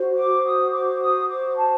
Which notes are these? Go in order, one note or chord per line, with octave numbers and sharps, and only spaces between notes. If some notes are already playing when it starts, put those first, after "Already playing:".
Already playing: F#4 C5
D6
D#6
D6
D#6
D6
A5